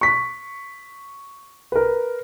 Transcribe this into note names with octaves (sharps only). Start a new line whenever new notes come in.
C#6 B6
A#4 B4